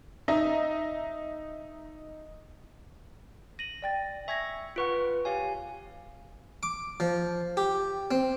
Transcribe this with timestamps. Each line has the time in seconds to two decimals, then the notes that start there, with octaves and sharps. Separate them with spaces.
0.28 D#4 D#5 E5 A#5
3.59 A#6 D#7 F#7
3.82 D5 G5 A6
4.28 E5 G#5 C#6 G#6 A#6
4.76 F4 B4 F#5 C#6 F6 D7
5.25 G4 C#5 F5 G#5
6.63 D6
7.00 F3
7.57 G4
8.11 C4